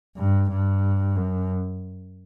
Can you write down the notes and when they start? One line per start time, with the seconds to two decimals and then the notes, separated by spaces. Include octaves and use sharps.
0.17 G2
0.50 G2
1.16 F#2